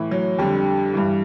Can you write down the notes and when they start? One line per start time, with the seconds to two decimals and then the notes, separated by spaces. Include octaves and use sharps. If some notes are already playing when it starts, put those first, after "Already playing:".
Already playing: A2 E3
0.11 F#3
0.38 F2 D3 G3
0.94 G2 E3